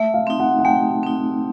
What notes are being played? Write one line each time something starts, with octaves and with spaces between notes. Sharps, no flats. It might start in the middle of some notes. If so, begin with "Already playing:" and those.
Already playing: A3 E5
F5
C4 D#4
F#5
F#5
A3 G5
C4 D#4